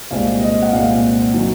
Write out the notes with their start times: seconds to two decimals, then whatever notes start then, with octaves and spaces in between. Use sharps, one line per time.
0.10 C2 A#2 G#3 C4 F5
0.42 D#5
0.62 F#5
0.72 C2 A#2 G#3 C4 F5
1.34 D#3 F#3